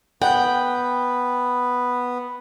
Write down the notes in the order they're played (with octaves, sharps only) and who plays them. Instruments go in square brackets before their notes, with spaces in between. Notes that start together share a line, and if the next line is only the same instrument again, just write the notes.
[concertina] B3 [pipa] F#5 [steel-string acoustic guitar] G5